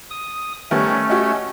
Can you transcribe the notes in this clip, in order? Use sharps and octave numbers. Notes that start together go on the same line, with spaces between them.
D#6
D#3 G3 A3 B3 C#4
F#4 G4 D#5